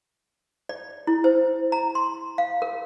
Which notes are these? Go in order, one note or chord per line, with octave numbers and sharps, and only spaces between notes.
D5
E4
C5
A#5
C6
F5
A#4